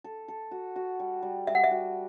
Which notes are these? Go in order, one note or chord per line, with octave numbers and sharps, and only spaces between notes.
A4
A4
F#4
F#4
G3
G3
G3 E5
F#5
E5
F#4